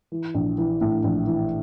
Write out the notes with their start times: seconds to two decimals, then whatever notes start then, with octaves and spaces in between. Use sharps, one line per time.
0.12 E3
0.34 A#1
0.58 E3
0.81 A2
1.04 A#1
1.27 E3